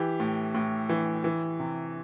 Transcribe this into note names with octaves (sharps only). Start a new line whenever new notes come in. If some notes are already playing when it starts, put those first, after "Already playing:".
Already playing: E3 G4
A2
A2
E3
E3
C3